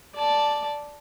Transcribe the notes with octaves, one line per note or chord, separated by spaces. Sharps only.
D5 A5